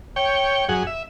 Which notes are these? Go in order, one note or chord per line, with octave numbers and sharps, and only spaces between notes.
C#5 G5
F#2 G#4 F#5
E5